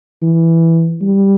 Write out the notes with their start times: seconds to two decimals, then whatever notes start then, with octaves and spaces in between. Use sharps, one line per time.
0.23 E3
1.02 G3